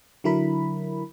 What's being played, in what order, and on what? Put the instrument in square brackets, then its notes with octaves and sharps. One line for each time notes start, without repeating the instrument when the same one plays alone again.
[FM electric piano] D3 F#3 E4 A#4 B5